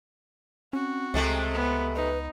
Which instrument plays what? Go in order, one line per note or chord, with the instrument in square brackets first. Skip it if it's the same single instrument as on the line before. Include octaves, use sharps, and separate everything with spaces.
[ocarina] C4 [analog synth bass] C#4 [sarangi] F#4
[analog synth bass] C#2 [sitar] C3 G#3 A3
[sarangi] B3
[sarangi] D#4 [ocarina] B4